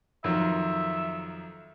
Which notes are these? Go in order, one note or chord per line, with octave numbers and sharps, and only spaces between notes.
F2 D#3 F#3 E5